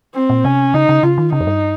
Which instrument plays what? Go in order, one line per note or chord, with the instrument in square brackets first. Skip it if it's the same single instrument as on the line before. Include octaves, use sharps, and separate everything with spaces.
[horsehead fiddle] C4
[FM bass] A#2
[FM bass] C3 [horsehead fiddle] C#4
[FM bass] C#3 [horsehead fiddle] D#4
[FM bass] C#3
[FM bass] C#3 [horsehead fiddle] F4
[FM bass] D#3
[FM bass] C#3 [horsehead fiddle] D#4
[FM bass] F2
G2